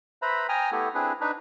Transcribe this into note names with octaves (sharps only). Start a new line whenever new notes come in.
B4 C5 E5 A#5 B5
G5 G#5 A#5 D#6 F6
A3 B3 E4 G4 A4
C4 D4 E4 G#4 B4
D4 D#4 B4